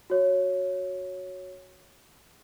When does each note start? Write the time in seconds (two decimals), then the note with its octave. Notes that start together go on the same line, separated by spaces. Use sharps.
0.10 F#4 C#5